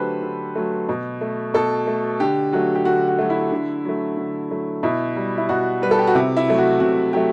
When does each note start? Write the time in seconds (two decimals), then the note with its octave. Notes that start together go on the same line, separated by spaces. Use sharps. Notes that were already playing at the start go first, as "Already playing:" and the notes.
Already playing: D3 F#3 A3 G4 A4 B4 C5
0.22 D3
0.56 F#3 A3
0.89 B2
1.21 A3
1.54 B2 A4
1.87 A3
2.20 D3 G4
2.53 F#3 A3 F#4
2.75 G4
2.85 D3 F#4
3.08 F#4
3.19 F#3 A3
3.30 E4
3.52 D3
3.85 F#3 A3
4.17 D3
4.50 F#3 A3
4.83 B2 E4
5.16 G3
5.38 E4
5.49 B2 F#4
5.82 G3 B4
5.91 A4
5.99 G4
6.07 F#4
6.15 C3 E4
6.37 E4
6.48 F#3 A3
6.58 F#4
6.80 C3 F#4
7.13 F#3 A3 G4